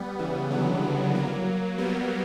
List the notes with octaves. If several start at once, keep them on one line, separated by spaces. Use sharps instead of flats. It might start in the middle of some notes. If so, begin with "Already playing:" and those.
Already playing: G3 B3
C#3 E3
D3 F#3
F#3 A#3
G3 B3